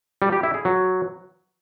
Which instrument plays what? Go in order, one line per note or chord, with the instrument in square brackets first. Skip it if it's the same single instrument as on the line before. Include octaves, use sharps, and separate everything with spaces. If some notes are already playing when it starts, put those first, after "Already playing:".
[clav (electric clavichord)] G3
G4
E4
G#4
F#3